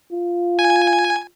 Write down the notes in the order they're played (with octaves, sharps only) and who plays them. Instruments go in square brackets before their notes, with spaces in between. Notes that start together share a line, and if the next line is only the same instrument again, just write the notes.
[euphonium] F4
[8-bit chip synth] G#5